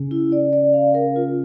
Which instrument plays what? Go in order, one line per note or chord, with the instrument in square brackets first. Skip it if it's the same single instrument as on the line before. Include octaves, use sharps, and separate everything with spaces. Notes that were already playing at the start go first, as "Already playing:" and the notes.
Already playing: [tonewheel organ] C#3
[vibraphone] E4
D5
D5
F5
A#4
F4